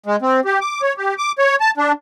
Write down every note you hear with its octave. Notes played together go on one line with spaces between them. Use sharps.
G#3
C4
G4
D6
C#5
G4
D6
C#5
A5
D4